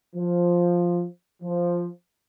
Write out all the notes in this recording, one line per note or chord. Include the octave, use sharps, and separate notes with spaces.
F3
F3